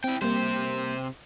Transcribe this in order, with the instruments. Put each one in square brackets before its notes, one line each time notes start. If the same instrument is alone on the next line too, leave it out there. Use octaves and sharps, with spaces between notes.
[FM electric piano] C4 [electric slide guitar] E4 G5
[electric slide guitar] C3 C5 [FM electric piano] G3 A#3